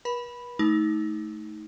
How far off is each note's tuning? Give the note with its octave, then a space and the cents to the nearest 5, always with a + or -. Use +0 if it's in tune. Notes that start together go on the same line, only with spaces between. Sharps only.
B4 -45 B5 +0
A3 -15 D#4 +25